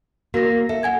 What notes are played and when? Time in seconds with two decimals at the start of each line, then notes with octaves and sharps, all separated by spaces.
0.34 A#3 F#4 A#4 A#6
0.69 A4 E5
0.83 F#5 G#5 G#6